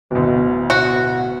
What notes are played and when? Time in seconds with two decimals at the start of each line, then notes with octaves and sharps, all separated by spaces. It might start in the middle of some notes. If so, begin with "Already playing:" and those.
0.11 D1 D2 B2
0.70 B2 F#4